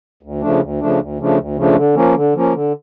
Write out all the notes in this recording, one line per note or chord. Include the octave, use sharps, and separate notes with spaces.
D2
C#3 F3 A3 D4
D2
C#3 F3 A3 D4
D2
C#3 F3 A3 D4
D2
C#3 F3 A3 D4
D3
F3 A#3 C#4
D3
F3 A#3 C#4
D3